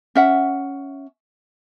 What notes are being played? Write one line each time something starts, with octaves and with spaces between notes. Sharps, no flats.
C#4 E5 F#5